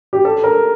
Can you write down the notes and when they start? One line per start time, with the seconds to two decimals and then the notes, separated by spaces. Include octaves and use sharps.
0.13 G4
0.25 A4
0.44 A#4